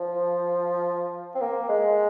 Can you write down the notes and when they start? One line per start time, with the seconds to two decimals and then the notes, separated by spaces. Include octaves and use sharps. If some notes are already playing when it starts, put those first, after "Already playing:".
Already playing: F3
1.35 C4
1.42 A#3
1.69 G#3